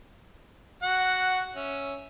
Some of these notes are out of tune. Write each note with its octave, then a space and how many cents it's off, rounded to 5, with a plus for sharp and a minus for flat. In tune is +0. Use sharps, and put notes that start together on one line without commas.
F#4 +5 F#5 +0
C#4 +0 E5 +0